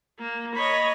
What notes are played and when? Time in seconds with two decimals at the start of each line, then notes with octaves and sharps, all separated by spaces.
0.19 A#3
0.56 C#5 D#5 B5